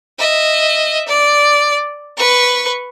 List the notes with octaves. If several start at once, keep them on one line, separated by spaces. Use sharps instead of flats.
D#5 E5
D5
B4 C#6